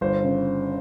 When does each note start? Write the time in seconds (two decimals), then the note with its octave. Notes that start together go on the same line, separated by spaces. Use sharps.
0.01 G1 C5
0.24 C#3